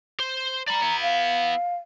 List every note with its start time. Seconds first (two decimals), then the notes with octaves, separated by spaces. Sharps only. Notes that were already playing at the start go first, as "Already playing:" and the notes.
0.20 C5
0.68 D5 A#5 B5
0.82 B3 E4
1.02 F5